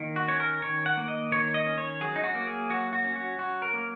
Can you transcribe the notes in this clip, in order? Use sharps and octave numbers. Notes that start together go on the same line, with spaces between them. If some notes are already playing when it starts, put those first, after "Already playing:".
Already playing: D#3 A#3
F#4
C#4 C#5
A#4
D#3 C#5
F#5
A#3
D#5
D#3 C#5
D#5
C#4
C#5
F#3 G#4
D#4
F#4
A#3
G#4
F#3 F#4
F#4
C#4
F#4
F#3 F#4
A#4
A#3